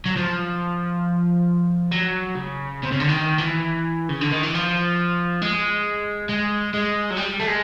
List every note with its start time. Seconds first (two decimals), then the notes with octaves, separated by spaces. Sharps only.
0.06 F#3
0.16 F3
1.92 F#3
2.35 C#3
2.83 C3
2.92 C#3
3.00 D3
3.09 D#3
3.38 E3
4.09 C#3
4.21 D3
4.32 D#3
4.43 E3
4.55 F3
5.42 G#3
6.29 G#3
6.74 G#3
7.10 F#3
7.17 G3
7.39 A3
7.47 G#3